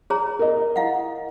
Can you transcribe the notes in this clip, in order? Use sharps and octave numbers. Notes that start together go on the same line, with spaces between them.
G#4 C#5 A#5
A#4 D#5
E4 F5 F#5